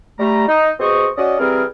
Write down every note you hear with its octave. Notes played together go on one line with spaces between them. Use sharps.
G3 A3 A#5
D#4
B2 C4 G#4 C5 D#5 C#6
C#4 F#4 D5 D#5
E3 G3 C4 G#4 A#4